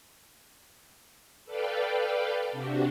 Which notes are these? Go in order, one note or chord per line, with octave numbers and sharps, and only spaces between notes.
A4 B4 D5 F5 G5
C3 D4 F#4 G4